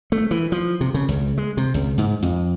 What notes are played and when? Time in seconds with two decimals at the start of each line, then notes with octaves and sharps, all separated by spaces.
0.12 A3
0.31 E3
0.52 F3
0.81 C3
0.94 C#3
1.09 C#2
1.38 G#3
1.57 C3
1.74 C#2
1.98 G#2
2.23 F2